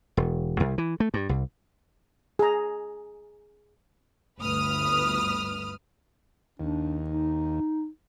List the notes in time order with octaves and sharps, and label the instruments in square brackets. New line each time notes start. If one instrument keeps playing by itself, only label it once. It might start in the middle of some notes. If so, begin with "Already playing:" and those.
[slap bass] E1
C2
E3
A3
G2
C2
[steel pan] G#4 A#5
[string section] G1 D2 B4 D#6 F6
[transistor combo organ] D#2 [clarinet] D4
[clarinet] D#4